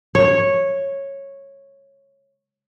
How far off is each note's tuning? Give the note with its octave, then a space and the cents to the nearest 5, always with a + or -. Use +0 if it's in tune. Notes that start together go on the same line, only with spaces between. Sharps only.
C#5 -10